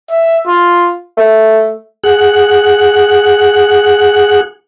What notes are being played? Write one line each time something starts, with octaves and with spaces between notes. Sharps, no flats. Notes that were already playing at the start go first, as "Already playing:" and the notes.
E5
F4
A3
G#4 F#5